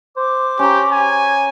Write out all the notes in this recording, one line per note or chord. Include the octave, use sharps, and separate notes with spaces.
C5 D6
C#4 G4 A#5
G#5